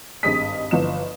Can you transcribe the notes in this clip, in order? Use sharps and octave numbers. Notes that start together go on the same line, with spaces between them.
G#1 G2 G#4 D#5 D#6 B6
G1 E3 F3 D#5 E7